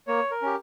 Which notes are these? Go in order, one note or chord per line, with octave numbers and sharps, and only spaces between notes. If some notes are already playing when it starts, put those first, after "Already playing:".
A#3 C#5
A#4
C#4 G4